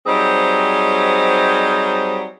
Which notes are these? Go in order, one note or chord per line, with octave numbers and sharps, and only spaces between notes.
F#3 G3 C4 D#4 G#4 C5